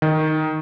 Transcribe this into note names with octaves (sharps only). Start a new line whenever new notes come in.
D#3